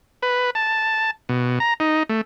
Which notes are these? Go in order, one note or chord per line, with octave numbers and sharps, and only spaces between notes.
B4
A5
B2
A#5
D#4
A3